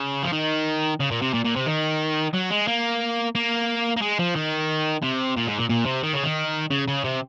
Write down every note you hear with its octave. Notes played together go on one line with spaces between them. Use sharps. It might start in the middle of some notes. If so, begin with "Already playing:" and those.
Already playing: C#3
F3
D#3
C#3
A#2
C3
A#2
A#2
C3
D#3
F#3
G#3
A#3
A#3
A#3
G#3
F3
D#3
C3
A#2
G#2
A#2
A#2
C3
D#3
C#3
D#3
C#3
C#3
C3